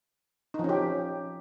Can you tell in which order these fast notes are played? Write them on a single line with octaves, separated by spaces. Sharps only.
D#4 F3 C#4 G4